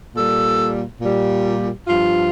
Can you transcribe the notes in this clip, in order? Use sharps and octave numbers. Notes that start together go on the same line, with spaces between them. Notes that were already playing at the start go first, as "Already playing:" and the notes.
A#2 G3 A4
A#2 G3
G2 F3 F4